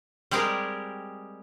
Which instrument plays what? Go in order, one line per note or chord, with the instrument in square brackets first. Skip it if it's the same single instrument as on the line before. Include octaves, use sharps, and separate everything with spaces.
[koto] G3 G#3 C4 G4 G#4 A#4